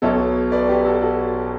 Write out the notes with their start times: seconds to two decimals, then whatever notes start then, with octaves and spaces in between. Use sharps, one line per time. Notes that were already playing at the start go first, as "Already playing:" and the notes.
0.02 B1 B2 F#3 B3 A4 C#5
0.52 B4 D5
0.69 G4 B4
0.85 F#4 A4
1.01 F#4 A4